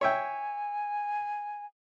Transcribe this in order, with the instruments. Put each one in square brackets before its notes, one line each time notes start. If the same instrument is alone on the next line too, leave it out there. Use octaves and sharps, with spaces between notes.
[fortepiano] C#5 E5 G5 [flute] G#5